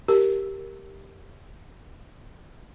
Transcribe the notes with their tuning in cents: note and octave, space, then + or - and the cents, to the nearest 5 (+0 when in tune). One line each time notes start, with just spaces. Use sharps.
G4 +0 A#4 +0